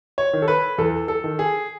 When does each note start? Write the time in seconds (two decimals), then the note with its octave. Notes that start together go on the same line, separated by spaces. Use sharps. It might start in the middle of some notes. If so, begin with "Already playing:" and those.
0.18 C#5
0.33 D#3
0.42 A4
0.48 B4
0.78 E2 A4
1.08 A4
1.24 D#3
1.39 G#4